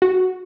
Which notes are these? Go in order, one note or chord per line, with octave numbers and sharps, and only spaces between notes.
F#4